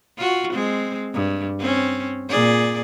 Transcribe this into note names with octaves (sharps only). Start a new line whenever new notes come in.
F4 F#4
G#3 C4
G2
C4 C#4
A#2 G#4 D5